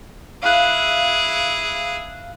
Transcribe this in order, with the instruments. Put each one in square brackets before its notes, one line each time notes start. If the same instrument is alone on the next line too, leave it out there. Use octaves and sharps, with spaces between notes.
[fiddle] E4 G#4 [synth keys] F5 F#6